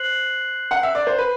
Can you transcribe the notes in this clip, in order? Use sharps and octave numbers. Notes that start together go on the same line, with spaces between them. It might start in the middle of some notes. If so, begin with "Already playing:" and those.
Already playing: C5 F#6 C7 F#7
F#5
E5
D5
C5
B4